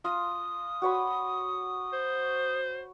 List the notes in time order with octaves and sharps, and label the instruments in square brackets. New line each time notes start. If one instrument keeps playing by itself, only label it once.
[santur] F4 [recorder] D#6
[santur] F#4 C#5 B5
[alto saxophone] C5